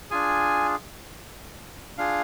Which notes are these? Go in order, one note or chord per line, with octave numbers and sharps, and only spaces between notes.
D4 F4 G#4 G#5
D4 F4 G#4 F5